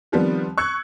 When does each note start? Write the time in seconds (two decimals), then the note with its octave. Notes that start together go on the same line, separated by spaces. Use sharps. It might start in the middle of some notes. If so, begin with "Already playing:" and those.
0.12 D#3 F3 G3 B3 C4
0.58 C#6 E6 F#6 G#6 C#7